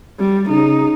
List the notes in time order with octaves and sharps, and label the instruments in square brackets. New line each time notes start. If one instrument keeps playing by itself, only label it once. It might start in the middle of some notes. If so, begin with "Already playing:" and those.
[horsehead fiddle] G3
[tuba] C#3 [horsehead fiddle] D#4